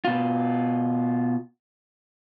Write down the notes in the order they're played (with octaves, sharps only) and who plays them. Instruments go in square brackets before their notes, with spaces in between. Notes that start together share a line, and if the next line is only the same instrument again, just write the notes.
[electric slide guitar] B2 F4